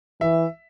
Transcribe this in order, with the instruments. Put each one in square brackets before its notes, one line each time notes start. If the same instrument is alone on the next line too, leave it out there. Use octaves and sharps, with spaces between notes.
[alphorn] E3 [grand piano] E5